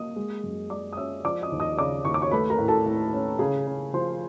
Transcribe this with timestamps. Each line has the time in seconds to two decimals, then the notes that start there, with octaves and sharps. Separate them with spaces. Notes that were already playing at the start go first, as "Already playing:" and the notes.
Already playing: A#3 D#5 D#6
0.16 G#3
0.43 F#2
0.70 G#3 D5 D6
0.93 D#6
0.97 C#4 E5 E6
1.24 F3 D5 D6
1.42 D#5 D#6
1.52 D#2
1.60 D#5 D#6
1.78 C#3 D5 D6
2.05 D#2 C#6
2.14 D6
2.22 C#5 C#6
2.31 A3 B4 B5
2.50 A#4 A#5
2.59 A2
2.68 A4 A5
2.86 A2
3.13 C#4
3.39 C#3 G#4 G#5
3.67 C#3
3.93 F3 C5 C6